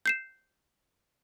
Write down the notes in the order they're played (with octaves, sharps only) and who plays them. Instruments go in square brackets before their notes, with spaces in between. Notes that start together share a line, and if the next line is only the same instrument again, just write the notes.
[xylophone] G6 C7 E7